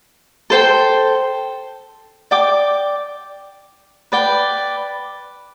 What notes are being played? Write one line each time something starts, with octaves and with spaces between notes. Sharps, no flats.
A4 C5 G5
D5 G5 D6
B4 D5 G5